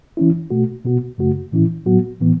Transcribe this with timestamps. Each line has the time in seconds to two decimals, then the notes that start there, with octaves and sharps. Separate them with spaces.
0.17 E3 C#4 E4
0.50 B2 A3 F#4
0.84 B2 B3 F#4
1.18 F#2 C#3 A3 F#4
1.52 A2 E3 C#4 E4
1.86 A2 F#3 B3 F#4
2.20 A2 E3 B3